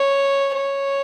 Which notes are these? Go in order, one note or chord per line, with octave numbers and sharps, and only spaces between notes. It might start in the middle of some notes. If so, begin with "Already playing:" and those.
Already playing: C#5
C#5